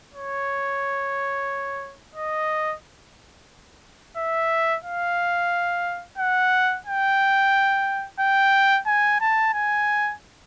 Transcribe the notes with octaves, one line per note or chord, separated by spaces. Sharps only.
C#5
D#5
E5
F5
F#5
G5
G5
G#5
A5
G#5